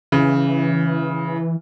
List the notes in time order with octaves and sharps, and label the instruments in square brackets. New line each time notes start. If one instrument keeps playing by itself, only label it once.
[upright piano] C#3 [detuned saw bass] E3